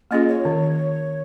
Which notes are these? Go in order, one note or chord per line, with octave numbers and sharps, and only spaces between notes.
A#3 C#4 F4 G#4 D#5
C#5
D#3